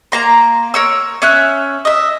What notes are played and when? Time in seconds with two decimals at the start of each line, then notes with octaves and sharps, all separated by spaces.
0.12 A#3 A#5 C6
0.74 A#4 C#5 E6
1.22 C#4 E5 F#6
1.85 D#5 E5